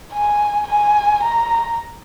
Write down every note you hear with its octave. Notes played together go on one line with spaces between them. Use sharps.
G#5
G#5
A#5